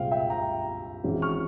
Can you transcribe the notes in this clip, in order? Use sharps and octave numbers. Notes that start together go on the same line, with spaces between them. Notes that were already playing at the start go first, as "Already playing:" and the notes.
Already playing: C2 A#2 G#3 C4 F5 G5
E5 G5
G5 A#5
G#1 G#2 E3 G#3 C#4
C#6 F6